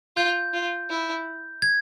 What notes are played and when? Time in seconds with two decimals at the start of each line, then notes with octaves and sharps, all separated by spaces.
0.16 F4 G6
0.53 F4
0.90 E4
1.62 G#6